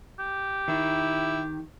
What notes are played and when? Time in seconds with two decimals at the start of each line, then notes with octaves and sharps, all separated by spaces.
0.19 G4
0.68 D#3 E4